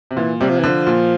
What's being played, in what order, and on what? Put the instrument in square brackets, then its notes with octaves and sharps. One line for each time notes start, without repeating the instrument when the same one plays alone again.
[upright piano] C3
[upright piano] A#2 [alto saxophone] E3
[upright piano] C3 [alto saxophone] G3
[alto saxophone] F3
E3
[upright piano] D3 [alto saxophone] F3
[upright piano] A#2